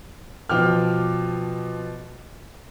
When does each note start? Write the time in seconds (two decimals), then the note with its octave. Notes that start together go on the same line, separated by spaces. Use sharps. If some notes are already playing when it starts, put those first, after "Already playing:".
0.49 B2 F3 G5 D6 F6